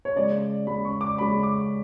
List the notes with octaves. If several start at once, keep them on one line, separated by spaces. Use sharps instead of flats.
C#5
C#3 G#3 C#4 D5
C#3 G#3 C#4 B5
C#6
D6
C#3 G#3 C#4 B5
D6